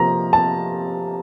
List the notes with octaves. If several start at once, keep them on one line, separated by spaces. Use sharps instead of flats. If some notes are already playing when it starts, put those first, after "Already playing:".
Already playing: C3 F3 A#3 A#5
A5